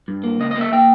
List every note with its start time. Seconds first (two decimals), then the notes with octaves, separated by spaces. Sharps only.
0.08 G2
0.23 A#3
0.40 C#2 D#5
0.51 D#5
0.56 A#3
0.61 E5
0.72 A#3 G5